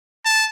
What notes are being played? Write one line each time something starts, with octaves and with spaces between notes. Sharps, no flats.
A5